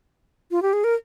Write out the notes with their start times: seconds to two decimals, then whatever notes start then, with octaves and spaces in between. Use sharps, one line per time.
0.51 F4
0.62 G4
0.73 G#4
0.84 A#4